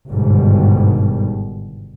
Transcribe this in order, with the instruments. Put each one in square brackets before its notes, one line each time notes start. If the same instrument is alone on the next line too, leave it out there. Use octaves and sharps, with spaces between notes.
[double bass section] G1 G#2 B2 D#3 G3